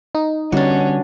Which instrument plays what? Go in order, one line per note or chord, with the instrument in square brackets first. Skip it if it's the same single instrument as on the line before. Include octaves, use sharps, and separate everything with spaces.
[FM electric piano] D#4
[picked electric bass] D3 G3 [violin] C#4 [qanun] D4 F#4